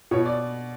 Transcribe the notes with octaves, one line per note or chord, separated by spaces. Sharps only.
B2 C#5
D5